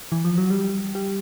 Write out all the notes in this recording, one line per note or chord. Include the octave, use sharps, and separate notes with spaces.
E3
F3
F#3
G3
G3